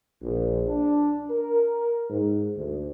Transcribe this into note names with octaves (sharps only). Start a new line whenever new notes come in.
A#1
D4
A#4
G#2
D2